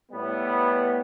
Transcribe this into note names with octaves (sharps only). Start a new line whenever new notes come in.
A2 G3 B3